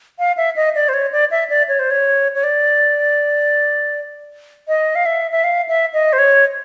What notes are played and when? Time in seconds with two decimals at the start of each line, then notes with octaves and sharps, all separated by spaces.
0.19 F5
0.37 E5
0.56 D#5
0.75 D5
0.89 C5
0.94 C#5
1.12 D5
1.31 E5
1.50 D5
1.68 C#5
1.79 C5
1.91 C#5
2.35 C#5
2.44 D5
4.68 D#5
4.95 F5
5.06 E5
5.31 E5
5.44 F5
5.68 E5
5.93 D#5
6.13 C5
6.18 C#5